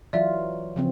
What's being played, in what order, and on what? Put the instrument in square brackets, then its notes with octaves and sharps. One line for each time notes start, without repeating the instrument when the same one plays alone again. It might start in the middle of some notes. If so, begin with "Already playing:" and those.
[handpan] E3 F#3 F4 [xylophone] D5 E5
[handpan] C#3 F3 C4